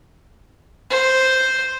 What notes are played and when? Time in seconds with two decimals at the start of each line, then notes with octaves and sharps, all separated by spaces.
0.90 C5